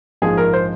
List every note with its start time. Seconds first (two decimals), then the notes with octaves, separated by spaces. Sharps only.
0.22 A#1 G#2 F3 G#4
0.37 A#4
0.53 C5